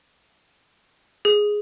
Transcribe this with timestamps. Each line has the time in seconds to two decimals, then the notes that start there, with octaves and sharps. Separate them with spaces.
1.25 G#4